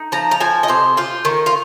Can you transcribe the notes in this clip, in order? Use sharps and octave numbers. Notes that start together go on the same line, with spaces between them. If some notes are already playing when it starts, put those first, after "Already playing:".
Already playing: D#4
F3 A#5
A#5
F3 G#5
D#5
C3 C5
F4 C5
D#3
F4